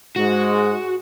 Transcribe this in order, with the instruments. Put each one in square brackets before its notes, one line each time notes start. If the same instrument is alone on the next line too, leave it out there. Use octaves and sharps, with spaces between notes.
[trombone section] G#2 G#3 [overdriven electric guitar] F#4